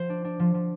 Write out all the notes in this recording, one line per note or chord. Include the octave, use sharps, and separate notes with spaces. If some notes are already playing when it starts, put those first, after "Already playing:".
Already playing: F3 C5
D4
D4
F3
F3